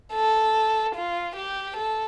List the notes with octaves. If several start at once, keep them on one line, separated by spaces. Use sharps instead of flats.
A4
F4
G4
A4